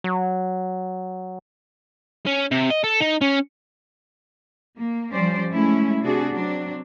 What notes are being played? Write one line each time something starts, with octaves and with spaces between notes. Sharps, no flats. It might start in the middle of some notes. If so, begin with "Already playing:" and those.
F#3
C#4
C3
D#5
A4
D#4
C#4
A#3
F3 G3 C#4 C5 D5
G#3 A3 C#4 E4
C3 D4 F#4 G#4
F#3 C4 D4